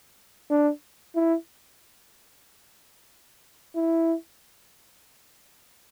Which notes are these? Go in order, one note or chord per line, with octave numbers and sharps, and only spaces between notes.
D4
E4
E4